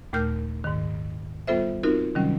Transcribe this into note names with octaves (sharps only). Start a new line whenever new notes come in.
D#2 A#2 A3 A#4 F6 G6
G#2 D#3
G3 B3 F4 A4 C5 E5
C4 D#4 F4 F#4 A#4
C3 D#3 F#3 G3 C#4